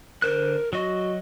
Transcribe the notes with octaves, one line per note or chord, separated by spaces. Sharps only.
D3 A#4 C5 F#6
F#3 F#4 D#5